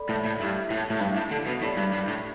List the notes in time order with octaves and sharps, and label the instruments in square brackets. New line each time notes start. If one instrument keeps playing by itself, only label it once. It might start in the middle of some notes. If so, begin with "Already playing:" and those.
Already playing: [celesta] A4 D5 B5
[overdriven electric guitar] A2
A2
[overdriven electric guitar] G2 [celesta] E4 G4 E5
[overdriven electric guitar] A2
A2
[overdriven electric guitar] G2 [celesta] E4
[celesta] G4 E5
[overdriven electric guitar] A2
D3
B2
[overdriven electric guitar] A2 [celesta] E4 G4 D5 B5
[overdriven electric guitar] G2
G2
A2